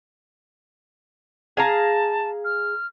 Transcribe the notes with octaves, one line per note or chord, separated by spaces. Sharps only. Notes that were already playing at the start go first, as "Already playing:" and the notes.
G#4 F5 A5 A#5
F6